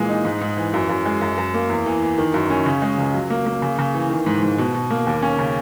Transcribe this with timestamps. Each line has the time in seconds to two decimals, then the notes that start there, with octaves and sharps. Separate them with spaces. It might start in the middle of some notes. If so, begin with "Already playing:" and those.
Already playing: A#2 E3 G#3
0.09 D#4
0.25 G#2
0.41 G#2
0.57 E3
0.74 F#2
0.89 F#2
1.06 G#3
1.21 F#2
1.38 F#2
1.54 A#3
1.70 E2
1.86 E3
2.02 E3
2.18 D#3
2.34 F#2
2.50 C#4
2.66 C#3
2.82 G#3
2.98 C#2
3.14 F#3
3.30 A#3
3.46 A#3
3.62 C#3
3.79 C#3
3.94 E3
4.10 D#3
4.26 G#2
4.43 G#2
4.58 B2
4.75 B2
4.90 A#3
5.07 D#2
5.23 C#4
5.39 C#3